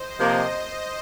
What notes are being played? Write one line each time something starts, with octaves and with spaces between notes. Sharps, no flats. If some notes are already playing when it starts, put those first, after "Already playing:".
Already playing: C5 D#5
C3 F3 A#3